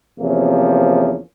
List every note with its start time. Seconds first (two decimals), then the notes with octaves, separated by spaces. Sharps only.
0.18 E2 C3 F3 A#3 C#4